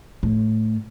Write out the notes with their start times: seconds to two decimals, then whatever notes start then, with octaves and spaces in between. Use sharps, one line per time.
0.23 A2